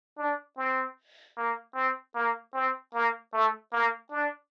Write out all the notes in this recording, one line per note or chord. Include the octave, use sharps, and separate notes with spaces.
D4
C4
A#3
C4
A#3
C4
A#3
A3
A#3
D4